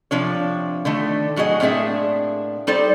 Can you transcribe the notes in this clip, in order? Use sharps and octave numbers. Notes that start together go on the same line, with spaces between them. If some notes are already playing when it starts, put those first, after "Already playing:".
C3 F3 D4 C#5
D3 D#3 A3
A2 F#3 F#4 G#4 D#5
A2 A#3 C4 D4 G#4 E5
G3 D#4 A4 C5 D5